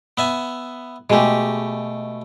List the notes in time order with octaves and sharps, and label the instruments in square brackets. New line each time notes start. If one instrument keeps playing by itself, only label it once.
[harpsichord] B3 E5 G#5
[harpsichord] B2 A3 [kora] G#3 G4